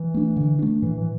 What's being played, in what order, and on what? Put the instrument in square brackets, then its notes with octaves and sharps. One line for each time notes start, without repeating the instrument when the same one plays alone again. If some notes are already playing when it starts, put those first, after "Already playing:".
Already playing: [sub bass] E3
[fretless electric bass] A3 D4
D3
A3 D4
[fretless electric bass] A2 [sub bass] E3
[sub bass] E3